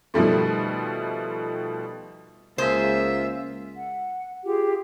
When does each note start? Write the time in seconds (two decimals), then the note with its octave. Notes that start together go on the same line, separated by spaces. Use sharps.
0.14 B2 D#3 F3 G3 A3
2.58 C#2 A#3 F4 G#4 C5 E5
3.76 F#5
4.44 F4 G4 G#4